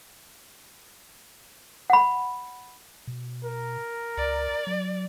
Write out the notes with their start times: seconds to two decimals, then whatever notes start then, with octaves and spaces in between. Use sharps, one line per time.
1.90 F#5 B5
3.07 B2
3.44 A#4
4.17 C#2 D5
4.67 F#3